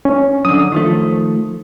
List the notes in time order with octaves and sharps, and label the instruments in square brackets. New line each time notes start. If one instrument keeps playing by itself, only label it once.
[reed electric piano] C#4
[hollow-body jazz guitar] F#2 D3 [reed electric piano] D#6
[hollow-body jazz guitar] D#3 F3 A3